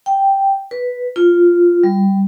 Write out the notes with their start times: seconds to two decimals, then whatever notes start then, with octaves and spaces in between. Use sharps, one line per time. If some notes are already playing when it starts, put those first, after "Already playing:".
0.06 G5
0.71 B4
1.16 F4
1.83 G3